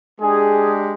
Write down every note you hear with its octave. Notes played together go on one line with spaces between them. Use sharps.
G#3 D4 G4 G#4